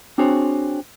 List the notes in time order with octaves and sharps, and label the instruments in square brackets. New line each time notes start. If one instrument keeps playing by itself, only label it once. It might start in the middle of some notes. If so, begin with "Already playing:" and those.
[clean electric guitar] C4 D4 F#4 G#4 C5 C#5